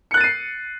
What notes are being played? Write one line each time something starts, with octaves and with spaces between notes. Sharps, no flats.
F#6 A6 C7 C#7 D#7